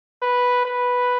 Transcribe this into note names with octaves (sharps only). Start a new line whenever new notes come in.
B4
B4